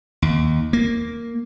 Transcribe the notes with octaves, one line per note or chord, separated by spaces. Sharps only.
D#2
A#3